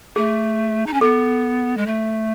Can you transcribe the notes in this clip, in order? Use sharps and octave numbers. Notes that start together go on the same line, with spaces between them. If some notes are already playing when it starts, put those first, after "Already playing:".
A3 G#4
D#4
C#4
B3 A4
G#3
A3